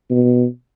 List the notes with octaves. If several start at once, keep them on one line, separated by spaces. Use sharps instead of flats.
B2